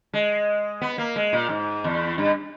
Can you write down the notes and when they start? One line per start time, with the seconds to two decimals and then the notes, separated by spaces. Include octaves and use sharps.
0.13 G#3
0.81 B3
0.98 A#3
1.16 G#3
1.33 A#2
1.49 G#2
1.84 E2
2.18 G2